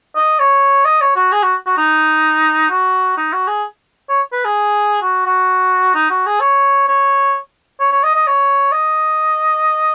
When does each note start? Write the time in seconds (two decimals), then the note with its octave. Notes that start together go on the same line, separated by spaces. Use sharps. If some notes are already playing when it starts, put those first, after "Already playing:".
0.16 D#5
0.40 C#5
0.85 D#5
1.01 C#5
1.16 F#4
1.32 G#4
1.43 F#4
1.66 F#4
1.78 D#4
2.70 F#4
3.17 D#4
3.33 F#4
3.47 G#4
4.09 C#5
4.32 B4
4.45 G#4
5.02 F#4
5.26 F#4
5.95 D#4
6.10 F#4
6.26 G#4
6.41 C#5
6.88 C#5
7.80 C#5
7.92 C#5
8.03 D#5
8.15 D#5
8.27 C#5
8.72 D#5